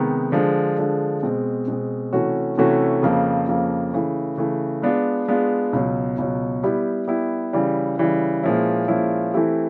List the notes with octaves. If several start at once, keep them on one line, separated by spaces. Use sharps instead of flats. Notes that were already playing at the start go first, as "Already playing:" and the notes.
Already playing: C3 D#3 G#3 B3 D#4
D3 F3 G#3
D3 F3 G#3
B2 G#3 C4
B2 G#3 C4
C3 E3 A3 C#4 F#4
C3 E3 A3 C#4 F#4
F2 C#3 F3 A#3
F2 C#3 F3 A#3
C#3 E3 A3
C#3 E3 A3
G#3 B3 D4 F4
G#3 B3 D4 F4
C#2 B2 F#3
C#2 B2 F#3
G3 B3 E4 G4
G3 B3 E4 G4
C#3 E3 G3
C#3 E3 G3
A#2 F3 G#3 C#4 E4
A#2 F3 G#3 C#4 E4
E3 A3 C4 E4 G4